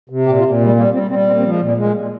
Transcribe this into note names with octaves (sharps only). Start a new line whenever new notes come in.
C3
A#2 G4
F4
A#2
G3 G#3
G3 A#3
G3 C4
G3 C4
A#2 C4
C4
F3
G#3
A#2 A#3
A#2 G#3
A#2